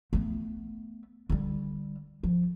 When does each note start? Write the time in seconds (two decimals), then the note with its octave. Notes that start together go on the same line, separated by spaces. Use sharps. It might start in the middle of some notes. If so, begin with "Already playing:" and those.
0.13 A3 B3
1.30 D3 G3
2.23 F3